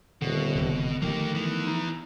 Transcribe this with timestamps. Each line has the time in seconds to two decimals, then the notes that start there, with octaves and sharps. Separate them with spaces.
0.22 D#1 B2 D3
0.56 E1 D#2 C3
1.02 D#3 F3 A3 A#3 G4
1.35 E3 B3
1.67 D#4